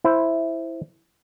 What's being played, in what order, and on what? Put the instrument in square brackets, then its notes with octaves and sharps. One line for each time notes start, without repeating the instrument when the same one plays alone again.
[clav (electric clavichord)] E4 C5